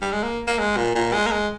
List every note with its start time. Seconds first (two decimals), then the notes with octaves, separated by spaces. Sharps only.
0.01 G3
0.12 G#3
0.23 A#3
0.47 A#3
0.59 G#3
0.77 A#2
0.95 A#2
1.13 G#3
1.26 A#3
1.32 G#3